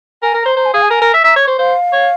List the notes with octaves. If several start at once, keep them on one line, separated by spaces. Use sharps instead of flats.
A#4 G#5
A#4
A#5
C5
C5 A#5
G#5
G#4 F5
G#5
A#4
A#4
E5
E5 A#5
C#5
C#6
C5
C5 F5
C#5